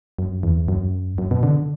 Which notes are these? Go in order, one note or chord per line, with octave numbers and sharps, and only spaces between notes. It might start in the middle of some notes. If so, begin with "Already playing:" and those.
F#2
E2
F#2
F#2
B2
D3